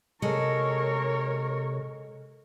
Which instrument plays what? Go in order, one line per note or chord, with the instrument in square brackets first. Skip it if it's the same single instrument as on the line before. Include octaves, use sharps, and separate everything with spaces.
[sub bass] C3 [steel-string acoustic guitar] G#3 A4 [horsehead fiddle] A#4 C#5